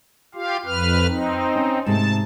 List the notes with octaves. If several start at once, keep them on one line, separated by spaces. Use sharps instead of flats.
F4 G4 F5
F2 B4 F6
C4 D#4
C#4
G#2 C3 A3 A5